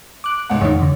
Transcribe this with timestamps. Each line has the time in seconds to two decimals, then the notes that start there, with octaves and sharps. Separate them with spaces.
0.24 D6 F#6
0.50 C#2 G#2 F#5
0.61 F2 D#3 C#5
0.82 D3